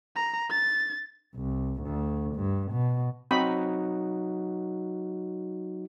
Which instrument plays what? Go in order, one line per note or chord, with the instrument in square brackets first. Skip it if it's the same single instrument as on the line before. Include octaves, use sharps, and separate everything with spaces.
[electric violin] A#5
A6
[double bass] C2
D2
G2
B2
[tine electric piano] F#3 D#4 F#4 [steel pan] C4 B5